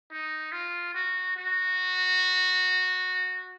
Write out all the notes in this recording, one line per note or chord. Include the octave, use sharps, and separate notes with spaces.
D#4
F4
F#4
F#4